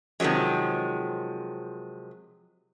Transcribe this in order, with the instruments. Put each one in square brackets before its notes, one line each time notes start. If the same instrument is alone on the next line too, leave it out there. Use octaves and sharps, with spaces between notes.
[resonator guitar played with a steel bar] C3 D#3 F3 F#3 G#3